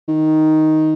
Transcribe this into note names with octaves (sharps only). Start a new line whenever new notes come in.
D#3